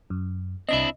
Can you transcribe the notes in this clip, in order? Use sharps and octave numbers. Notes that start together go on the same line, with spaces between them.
F#2
C2 C4 D4 E4 D#5